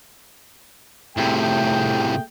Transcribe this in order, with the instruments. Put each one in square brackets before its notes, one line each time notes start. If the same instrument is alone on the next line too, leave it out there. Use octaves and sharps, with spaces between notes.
[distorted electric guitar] A2 C3 [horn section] A3 G#4 G5